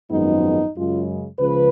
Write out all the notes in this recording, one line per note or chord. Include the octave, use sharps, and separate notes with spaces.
G#1 F#2 F3 G#3 B3 D#4
F#2 C#3 G#3 F4
C#2 C#3 F3 B4